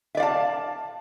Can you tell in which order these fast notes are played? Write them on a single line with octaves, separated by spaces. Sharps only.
E5 D5 F5 A5